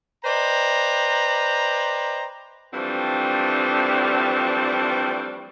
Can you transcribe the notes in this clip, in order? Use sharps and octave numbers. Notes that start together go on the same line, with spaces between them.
B4 C5 D5 D#5 G5 A#5
E3 F3 G3 A3 C4 D4